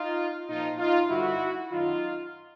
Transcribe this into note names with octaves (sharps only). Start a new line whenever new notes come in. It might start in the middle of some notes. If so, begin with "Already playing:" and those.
Already playing: D#4 F4
A#2 F3 D#4 F4
D#4 F4
G2 D3 F3 E4 F#4
F#2 D#3 F#3 D#4 F4